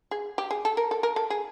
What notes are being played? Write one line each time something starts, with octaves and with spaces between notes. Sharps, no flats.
G#4
G4
G#4
A4
A#4
A4
A#4
A4
G#4